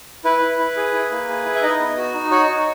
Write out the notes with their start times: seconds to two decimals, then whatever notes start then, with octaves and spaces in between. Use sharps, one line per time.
0.25 E4 B4
0.42 E4
0.59 E4
0.77 G#4
0.94 E4
1.11 A#3
1.28 G#4
1.45 E4
1.55 E5
1.63 D#4 D#5
1.80 B3
1.97 F#4
2.14 D#4
2.31 F#4 C#5
2.48 D#4